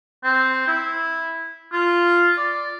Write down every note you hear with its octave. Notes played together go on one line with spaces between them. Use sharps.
C4
E4
F4
D5